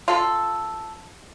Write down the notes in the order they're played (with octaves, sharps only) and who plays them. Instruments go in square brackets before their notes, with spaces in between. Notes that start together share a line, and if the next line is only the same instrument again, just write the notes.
[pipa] F4 A4